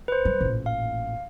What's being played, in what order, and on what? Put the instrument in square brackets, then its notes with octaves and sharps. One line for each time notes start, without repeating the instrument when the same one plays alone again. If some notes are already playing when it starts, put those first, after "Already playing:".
[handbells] B4 C5
[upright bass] G3
A1 A#2
[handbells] F5